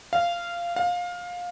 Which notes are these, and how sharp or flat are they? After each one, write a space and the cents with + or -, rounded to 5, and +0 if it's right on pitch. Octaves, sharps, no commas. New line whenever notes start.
F5 -15
F5 +20